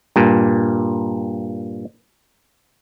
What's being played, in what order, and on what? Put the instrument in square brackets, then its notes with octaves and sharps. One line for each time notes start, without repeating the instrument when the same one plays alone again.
[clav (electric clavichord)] G2 A#2